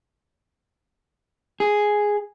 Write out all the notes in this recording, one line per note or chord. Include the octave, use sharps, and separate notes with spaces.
G#4